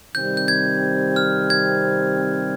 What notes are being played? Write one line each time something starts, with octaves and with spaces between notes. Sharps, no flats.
C3 D#3 G3 C4 G6
G6
G#6
F6
G#6